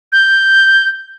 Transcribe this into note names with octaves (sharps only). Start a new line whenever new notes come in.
G6